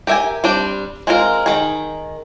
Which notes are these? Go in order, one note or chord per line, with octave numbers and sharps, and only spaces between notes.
G4 A#4 E5 G5 G#5
G3 C4 D4 C5 D5
G#3 C4 F4 A#4
D#3 G#4